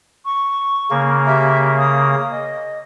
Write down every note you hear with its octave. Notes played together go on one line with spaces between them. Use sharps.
C#6
C#3 A#3
G4 E5
D#6
D#5